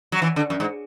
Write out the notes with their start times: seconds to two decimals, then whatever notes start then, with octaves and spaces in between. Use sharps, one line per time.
0.12 F#3
0.22 E3
0.36 D3
0.50 F#2
0.60 G#2